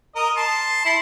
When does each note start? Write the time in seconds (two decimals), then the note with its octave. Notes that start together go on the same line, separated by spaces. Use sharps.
0.16 A#4 D#5
0.37 A5 C6
0.85 E4 C6